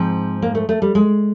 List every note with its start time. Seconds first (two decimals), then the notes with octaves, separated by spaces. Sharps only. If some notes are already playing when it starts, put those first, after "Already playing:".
Already playing: G#2 F3 C4
0.42 A#3
0.55 A3
0.69 A3
0.82 G3
0.95 G#3